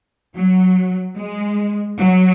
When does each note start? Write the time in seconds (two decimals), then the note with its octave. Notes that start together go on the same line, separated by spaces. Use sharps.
0.36 F#3
1.17 G#3
1.98 F#3